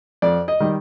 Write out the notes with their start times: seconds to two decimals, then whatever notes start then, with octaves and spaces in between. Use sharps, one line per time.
0.22 F2 D5
0.48 D#5
0.60 D#3 G3